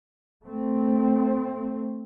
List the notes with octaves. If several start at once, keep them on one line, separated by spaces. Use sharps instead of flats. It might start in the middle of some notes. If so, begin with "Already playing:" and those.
A3 C4